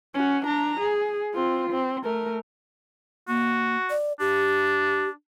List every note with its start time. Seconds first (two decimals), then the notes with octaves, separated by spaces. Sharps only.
0.14 C#4 F#4
0.46 D4 A#5
0.80 G#4
1.34 C4 F4
1.70 C4
2.04 A3 A#4
3.28 A#3 F#4
3.90 D5
4.20 D4 G4